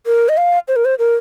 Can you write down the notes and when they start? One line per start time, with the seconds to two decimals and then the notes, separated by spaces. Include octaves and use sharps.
0.07 A#4
0.29 D#5
0.37 F5
0.68 C5
0.76 A#4
0.85 C5
0.99 A#4